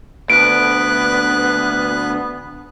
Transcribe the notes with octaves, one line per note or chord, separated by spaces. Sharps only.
D2 B3 B4 F#6 D7